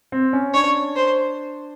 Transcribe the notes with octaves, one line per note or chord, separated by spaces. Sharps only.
C4
C#4
D4 C#5
C5